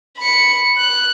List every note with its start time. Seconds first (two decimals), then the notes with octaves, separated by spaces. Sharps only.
0.18 B5 C#7
0.78 F#6